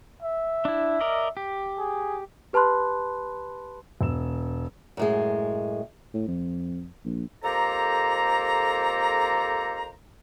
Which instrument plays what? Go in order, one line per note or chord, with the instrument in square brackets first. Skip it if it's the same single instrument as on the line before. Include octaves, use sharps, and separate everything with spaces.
[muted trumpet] E5
[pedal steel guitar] D4 E4
A#4 D5 D#5
G4
[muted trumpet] G#4
[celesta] G4 B4 A5 B5 C6 F#6
[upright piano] E1 E6 E7
[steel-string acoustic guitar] F#2 A2 G#3
[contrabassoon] A2
F2
A#1
[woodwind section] F2 A#3 G4 A4 C5 A#5